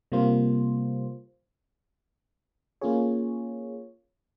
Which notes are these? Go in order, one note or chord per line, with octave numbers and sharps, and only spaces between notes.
C3 G3 A#3 F4 C5
A#3 C#4 F4 G#4 C#5